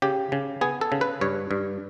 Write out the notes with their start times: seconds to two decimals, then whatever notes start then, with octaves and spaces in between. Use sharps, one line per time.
0.02 C#3 G4
0.32 C#3
0.61 B3 G#4
0.81 A4
0.92 C#3
1.01 B4
1.21 G2 C#5
1.51 G2